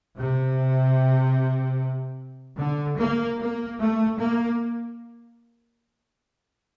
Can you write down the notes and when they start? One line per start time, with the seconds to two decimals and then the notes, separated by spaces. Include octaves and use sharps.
0.18 C3
2.59 D3
2.98 A#3
3.39 A#3
3.80 A3
4.19 A#3